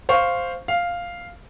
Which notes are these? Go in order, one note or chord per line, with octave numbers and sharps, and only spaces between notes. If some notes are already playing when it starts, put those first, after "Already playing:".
C5 F5 C#6
F5